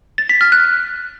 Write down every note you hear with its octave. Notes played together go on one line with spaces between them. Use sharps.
A6
B6
F6
F#6